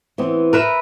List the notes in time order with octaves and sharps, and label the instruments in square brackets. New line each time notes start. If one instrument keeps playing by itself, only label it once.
[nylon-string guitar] E3 B3 C4
[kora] A#4 B4 E5